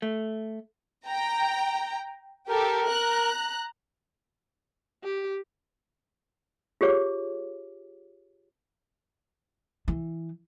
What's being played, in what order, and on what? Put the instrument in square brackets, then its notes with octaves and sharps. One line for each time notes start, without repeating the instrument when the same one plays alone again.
[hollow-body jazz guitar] A3
[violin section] G5 A#5
[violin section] G4 A4 [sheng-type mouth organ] A#4
[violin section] A#5 F#6
[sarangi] G4
[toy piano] F4 G4 G#4 C#5 D6
[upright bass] E3